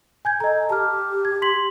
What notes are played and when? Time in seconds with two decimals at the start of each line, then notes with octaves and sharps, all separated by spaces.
0.25 G#5 G6 G#6
0.40 A4 D#5 A#5
0.70 G4 A5 F6
1.25 G#6
1.42 C6 B6 F#7